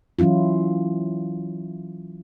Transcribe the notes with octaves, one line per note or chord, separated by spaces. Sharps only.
E3 F#3 C#4 E4 F4